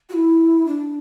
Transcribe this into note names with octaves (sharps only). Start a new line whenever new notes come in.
F#4
E4
D4